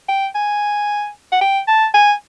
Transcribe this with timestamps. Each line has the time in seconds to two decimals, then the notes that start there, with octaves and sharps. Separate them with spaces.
0.08 G5
0.35 G#5
1.32 F#5
1.41 G5
1.67 A5
1.94 G#5